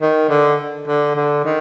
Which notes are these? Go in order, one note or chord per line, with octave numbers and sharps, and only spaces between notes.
D#3
D3
D3
D3
D#3